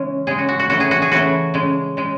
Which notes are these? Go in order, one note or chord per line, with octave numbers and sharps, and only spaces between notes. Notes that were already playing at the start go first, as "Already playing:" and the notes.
Already playing: C#3 E3 G#3 C#4
C#3 G#3 G#4
F#4
F#4
F#4
C#3 E3 A3 F#4
G#4
F#4
G#4
C#3 E3 A3 F#4
C#3 G#3
C#3 G#3